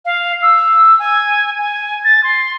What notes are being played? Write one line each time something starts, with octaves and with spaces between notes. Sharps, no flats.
F5
E6
G#5
G#5
A6
C6